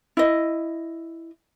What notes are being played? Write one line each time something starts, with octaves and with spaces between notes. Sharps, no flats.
E4 D#5